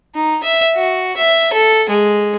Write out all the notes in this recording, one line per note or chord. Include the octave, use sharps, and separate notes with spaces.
D#4
E5
F#4
E5
A4
G#3